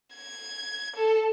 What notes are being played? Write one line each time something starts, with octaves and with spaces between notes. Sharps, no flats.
G#6
A4